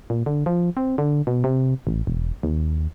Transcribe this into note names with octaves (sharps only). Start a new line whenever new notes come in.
A#2
D3
F3
C4
D3
B2
C3
A1
E1
D#2